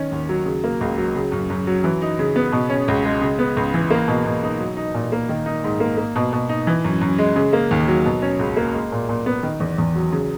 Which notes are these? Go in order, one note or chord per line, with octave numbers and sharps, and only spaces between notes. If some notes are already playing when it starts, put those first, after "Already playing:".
Already playing: D#3 C#4
D#2
F#3
C#3
A#3
C#2
F#3
C#3
F#2
F#2
F#3
E3
D#4
C#3
B3
B2
C#4
C#2
G#3
C#3
B3
C#2
E3
A#3
B2
B2
D#4
F#3
D#4
A#2
A#3
D#3
D#4
G#2
A#3
A#3
B2
B2
D#4
E3
F#2
F#2
G#3
C#3
A#3
D#2
F#3
B2
C#4
C#2
A#3
G#3
A#2
A#2
B3
D#3
E2
E2
F#3
C#3